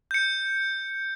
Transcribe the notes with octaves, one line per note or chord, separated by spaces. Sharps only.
G6 C#7